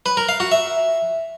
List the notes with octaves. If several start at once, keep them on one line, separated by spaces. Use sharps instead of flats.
B4
A#4
F5
F#4
E5